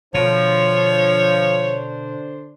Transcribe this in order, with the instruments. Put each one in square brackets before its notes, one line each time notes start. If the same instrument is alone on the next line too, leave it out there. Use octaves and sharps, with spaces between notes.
[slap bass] B2 [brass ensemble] D3 D4 C5 [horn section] F3 [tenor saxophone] C#5